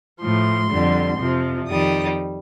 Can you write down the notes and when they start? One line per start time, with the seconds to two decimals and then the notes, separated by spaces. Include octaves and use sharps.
0.22 A2 F3 C6
0.71 F2 D3 G3
1.20 F2 C3 F3
1.68 F2 D#3 G3 D#6